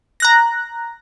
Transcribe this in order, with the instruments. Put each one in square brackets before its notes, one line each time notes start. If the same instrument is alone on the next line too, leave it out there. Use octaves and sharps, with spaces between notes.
[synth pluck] A#5 F#6 A#6